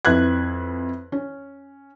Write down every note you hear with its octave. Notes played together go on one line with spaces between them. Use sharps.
F2 E4 B4 F#6 G#6
C#4